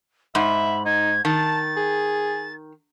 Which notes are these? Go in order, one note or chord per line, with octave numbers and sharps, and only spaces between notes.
G#2 E5 B5
D#4 G#6
D#3 A5 A6
G#4